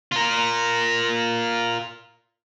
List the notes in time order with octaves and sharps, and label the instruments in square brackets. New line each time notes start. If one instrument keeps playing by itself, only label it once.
[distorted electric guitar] F4 A#4